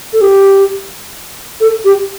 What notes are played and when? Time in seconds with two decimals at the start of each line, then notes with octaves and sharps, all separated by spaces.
0.13 A4
0.21 G4
1.61 A4
1.85 G4